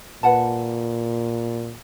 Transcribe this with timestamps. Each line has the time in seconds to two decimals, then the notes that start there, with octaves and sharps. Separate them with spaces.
0.23 A#2 B4 F#5 A5